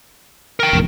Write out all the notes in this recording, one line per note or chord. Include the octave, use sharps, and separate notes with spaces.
A#4 G5
F1 A#1 E2